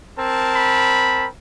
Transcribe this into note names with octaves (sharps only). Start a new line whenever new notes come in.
C4 A#4 A5
B5